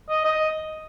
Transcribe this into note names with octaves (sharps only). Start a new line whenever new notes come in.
D#5
D#5